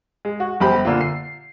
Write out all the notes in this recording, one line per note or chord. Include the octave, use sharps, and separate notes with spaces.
G#3
F#4
G1 F#2 G4 C5 B5
A#2 D3 A#3 F4
C7